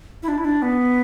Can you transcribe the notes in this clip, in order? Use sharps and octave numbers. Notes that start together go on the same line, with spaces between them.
E4
D4
E4
D4
B3